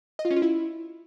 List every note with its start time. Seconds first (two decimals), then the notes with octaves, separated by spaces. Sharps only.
0.19 D#5
0.25 F4
0.31 C#4
0.36 F4
0.42 E4